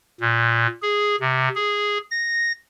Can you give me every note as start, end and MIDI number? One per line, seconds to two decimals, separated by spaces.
0.21 0.67 46
0.82 1.16 68
1.20 1.49 48
1.55 1.98 68
2.11 2.52 94